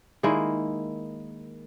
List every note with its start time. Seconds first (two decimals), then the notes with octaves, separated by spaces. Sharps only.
0.23 D#3 G#3 A#3 E4